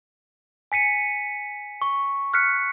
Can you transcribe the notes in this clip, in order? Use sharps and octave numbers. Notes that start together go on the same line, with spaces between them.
G#5 B6 C#7 D#7
C#6
F6 F#6 B6 C#7